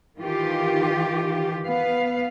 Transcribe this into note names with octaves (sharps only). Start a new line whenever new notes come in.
D#3 E3 F4 G4
B3 B4 F5